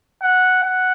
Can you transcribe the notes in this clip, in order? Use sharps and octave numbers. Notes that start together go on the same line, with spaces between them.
F#5
F#5